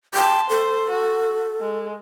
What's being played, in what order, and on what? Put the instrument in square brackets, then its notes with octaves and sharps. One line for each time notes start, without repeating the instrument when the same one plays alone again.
[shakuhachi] G5 [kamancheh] A5 C6
[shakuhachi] A4 [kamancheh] C5
[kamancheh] F#4
G#3